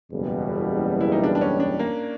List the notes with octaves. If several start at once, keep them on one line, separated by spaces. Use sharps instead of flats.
F#1 E2 B2 G3
E4
D#4
D4
D4
C#4
D4
A#3